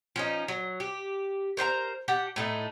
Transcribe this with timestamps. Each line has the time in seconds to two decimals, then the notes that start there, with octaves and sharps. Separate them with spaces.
0.16 F3 C#4 D#4
0.48 F#3
0.80 G4
1.57 A#4 C5 F5 A#5
2.08 G4 F#5 A5
2.36 A2 A3 D#4